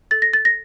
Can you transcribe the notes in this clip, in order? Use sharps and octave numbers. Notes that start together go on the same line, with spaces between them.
A4 A6
A#6
A6
A#6